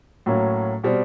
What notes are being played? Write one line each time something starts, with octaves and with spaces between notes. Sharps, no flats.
A2 F#3 A#3 C#4
B2 G3 C4